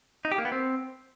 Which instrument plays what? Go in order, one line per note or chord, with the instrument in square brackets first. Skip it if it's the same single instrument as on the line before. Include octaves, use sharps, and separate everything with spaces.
[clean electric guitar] D#4
G4
A#3
B3
C4